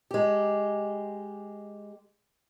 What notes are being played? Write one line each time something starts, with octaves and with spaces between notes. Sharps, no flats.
G#3 G4